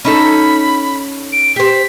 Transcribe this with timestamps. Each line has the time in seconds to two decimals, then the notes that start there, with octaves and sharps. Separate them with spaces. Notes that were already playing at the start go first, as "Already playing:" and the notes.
0.05 C#4 D#4 A4 B5
1.33 D7
1.56 G4 C5 B6